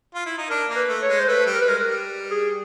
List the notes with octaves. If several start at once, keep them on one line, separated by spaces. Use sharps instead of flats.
F4
E4
D#4
D4 A#4
A#3
B4
A3
C#5
G#3
C5
A3 B4
G3
A#4
B4
G#3 A#4
A#4
G3
G#4